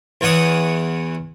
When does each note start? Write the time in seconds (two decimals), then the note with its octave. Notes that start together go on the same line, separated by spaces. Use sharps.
0.21 E2 E3 C#5 F#5 D#6